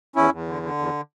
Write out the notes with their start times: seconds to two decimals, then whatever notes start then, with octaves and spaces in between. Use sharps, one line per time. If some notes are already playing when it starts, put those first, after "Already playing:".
0.16 E2 C#4 E4
0.32 E2
0.48 D3
0.63 D3
0.78 E2